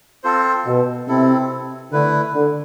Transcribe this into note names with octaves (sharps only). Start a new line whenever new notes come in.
C4 F4 A4 C5
B2
C3 C4 E4 A4
D3 A3 E4 B4
D3